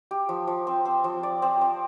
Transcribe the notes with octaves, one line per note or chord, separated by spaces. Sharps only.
G4
F3
F3
C4
C4
F3
D5
C4
C4